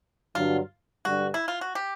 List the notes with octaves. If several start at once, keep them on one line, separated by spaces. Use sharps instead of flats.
G2 D3 F#3 F4
G2 D3 G3 F#4
E4
F4
F#4
G4